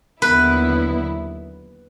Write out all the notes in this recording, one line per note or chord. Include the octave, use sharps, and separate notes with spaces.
D#2 D3 F#3 B3 E4 B4